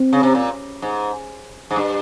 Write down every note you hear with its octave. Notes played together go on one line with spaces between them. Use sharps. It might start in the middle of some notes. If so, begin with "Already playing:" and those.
Already playing: C4
C#3
C3
A#2
G#2
G#2
G2